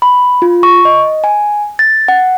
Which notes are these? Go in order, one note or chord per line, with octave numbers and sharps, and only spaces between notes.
B5
F4
C#6
D#5
G#5
A6
F#5